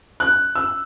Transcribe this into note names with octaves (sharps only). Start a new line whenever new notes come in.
F#6
E6